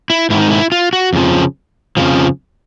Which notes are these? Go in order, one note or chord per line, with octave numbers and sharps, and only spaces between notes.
E4
G#2 D#3 E4
D#4
E4
F4
F#4
F2 C#3 F3
F2 C#3 F3